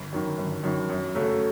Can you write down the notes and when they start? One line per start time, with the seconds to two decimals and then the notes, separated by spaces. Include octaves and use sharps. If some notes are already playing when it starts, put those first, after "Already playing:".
Already playing: G1
0.13 F#2 D#3
0.38 G1
0.64 F#2 D#3
0.89 F#2
1.15 C#3 F#3 A3